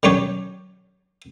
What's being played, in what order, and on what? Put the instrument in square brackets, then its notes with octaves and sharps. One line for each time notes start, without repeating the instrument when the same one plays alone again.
[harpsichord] D3 D#3 F#3 C#4 G4 C#5